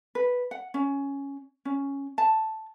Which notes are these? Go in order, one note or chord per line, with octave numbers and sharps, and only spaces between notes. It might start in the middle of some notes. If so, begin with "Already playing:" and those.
B4
F#5
C#4
C#4
A5